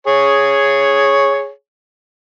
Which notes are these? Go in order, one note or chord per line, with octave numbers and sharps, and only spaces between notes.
G#4 C#5